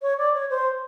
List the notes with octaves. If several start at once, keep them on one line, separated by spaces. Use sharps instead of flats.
C#5
D5
C#5
C5